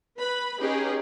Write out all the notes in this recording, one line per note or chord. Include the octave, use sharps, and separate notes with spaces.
B4 B5
C#4 D#4 G4 G#4 B4